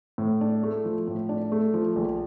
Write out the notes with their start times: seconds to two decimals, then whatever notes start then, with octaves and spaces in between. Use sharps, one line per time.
0.18 A2
0.41 D4
0.63 A3
0.85 F3
1.08 A2
1.29 D4
1.52 A3
1.74 F3
1.96 A#1